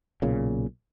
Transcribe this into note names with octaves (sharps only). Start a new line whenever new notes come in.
B1 A#2 C#3